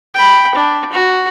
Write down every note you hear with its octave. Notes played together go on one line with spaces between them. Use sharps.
G5 B5
D4
F#4